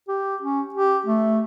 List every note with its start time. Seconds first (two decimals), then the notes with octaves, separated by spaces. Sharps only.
0.08 G4
0.42 C#4
0.74 G4
1.06 A3